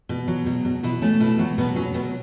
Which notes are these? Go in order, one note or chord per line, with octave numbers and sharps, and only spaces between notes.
B2
F#3
B2
B2
B2 E4
A3 C#4
B2 E4
F#3 F#4
B2 B3
F#3 C#4
B2 B3